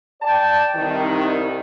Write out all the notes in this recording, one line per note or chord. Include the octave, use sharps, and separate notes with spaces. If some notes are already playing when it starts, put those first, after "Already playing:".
D5 G5 A5
C2 D#3